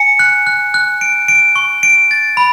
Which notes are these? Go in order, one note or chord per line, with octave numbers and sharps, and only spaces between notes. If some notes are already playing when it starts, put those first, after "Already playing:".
Already playing: G#5 C#7
F#6
F#6
F#6
D7
D7
C#6
D7
A6
B5